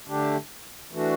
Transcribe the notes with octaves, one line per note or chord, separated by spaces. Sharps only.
D3 A3 D4 G4
E3 A3 D4 F#4